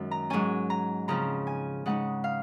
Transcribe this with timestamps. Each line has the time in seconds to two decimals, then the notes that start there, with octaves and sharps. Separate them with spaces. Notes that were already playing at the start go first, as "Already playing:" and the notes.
Already playing: F#2 D#3 G#3
0.11 A#5
0.30 G#2 F#3 C#4 G#5
0.70 A#5
1.08 C#3 F3 C4 A#5
1.47 G#5
1.86 C#3 G#3 D#4 F#5
2.24 F5